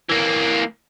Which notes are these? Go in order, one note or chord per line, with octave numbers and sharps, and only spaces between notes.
E3 A#3